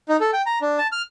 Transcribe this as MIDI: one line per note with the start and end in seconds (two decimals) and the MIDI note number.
0.09 0.17 63
0.20 0.31 69
0.33 0.42 79
0.46 0.59 82
0.62 0.78 62
0.78 0.87 81
0.92 1.02 89